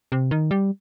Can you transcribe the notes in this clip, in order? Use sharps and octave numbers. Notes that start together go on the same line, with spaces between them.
C3
D#3
G3